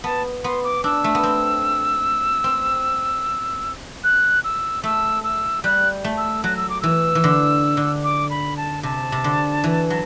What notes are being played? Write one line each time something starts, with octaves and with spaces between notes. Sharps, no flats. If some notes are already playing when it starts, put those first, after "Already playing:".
B3 A5
B3 C6
D6
D4 E6
A3
B3
C4
C4
F#6
E6
A3 E6
E6
G3 F#6
A3
E6
F#3 F#6
E6
D6
E3 E6
E3
D3
D3
D6
B5
A5
C3 A5
C3
D3
E3
F#3